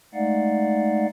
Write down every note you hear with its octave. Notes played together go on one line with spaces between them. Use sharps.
G#3 A3 D#4 D5 F5 F#5